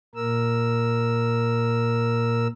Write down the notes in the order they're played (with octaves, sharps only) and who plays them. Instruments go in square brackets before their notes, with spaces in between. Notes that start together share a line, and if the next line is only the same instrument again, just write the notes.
[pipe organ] A#2 A#4 E6